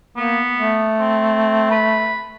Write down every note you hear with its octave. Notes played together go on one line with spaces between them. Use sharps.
A#3 B3
A3
C4
B4